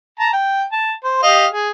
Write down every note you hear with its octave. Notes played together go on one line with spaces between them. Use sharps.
A5 A#5
G5
A5
C5
G4 D#5 F5
G#4